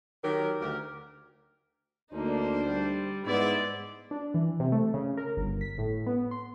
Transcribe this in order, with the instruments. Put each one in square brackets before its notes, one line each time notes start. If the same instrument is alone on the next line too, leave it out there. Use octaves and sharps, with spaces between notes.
[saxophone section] D#3 F#3 G4 A#4
D2 G4 A#4
[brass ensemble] D2 D4 C5 [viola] A#3 D#4
[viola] G3
[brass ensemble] G#2 B3 E4 [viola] G#3 D5
[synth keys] D4
E3
C3
A3
C#3
A#4
G1
B6
A2
B3
C6